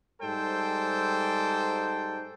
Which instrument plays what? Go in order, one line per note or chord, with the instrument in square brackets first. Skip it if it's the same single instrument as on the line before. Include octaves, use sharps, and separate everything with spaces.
[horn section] G#2 G3 A4 C5 G5